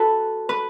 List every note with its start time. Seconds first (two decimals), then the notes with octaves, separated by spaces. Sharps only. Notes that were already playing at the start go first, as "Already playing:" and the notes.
Already playing: F#4 A4 B4
0.49 B4